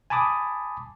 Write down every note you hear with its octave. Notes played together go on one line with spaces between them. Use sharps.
G#5 A5 B5 D6 D#6